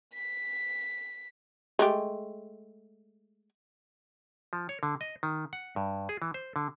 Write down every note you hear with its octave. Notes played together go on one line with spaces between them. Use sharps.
B6
G#3 A3 G4
F3
C#5
D3
D#5
D#3
F#5
G2
G#4
E3
C5
D3